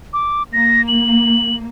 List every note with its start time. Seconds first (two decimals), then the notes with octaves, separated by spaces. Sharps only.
0.13 D6
0.53 A#3 A#6
0.88 F#7